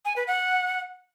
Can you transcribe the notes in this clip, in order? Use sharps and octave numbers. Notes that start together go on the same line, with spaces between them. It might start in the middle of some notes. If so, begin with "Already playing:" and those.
G#5
B4
F#5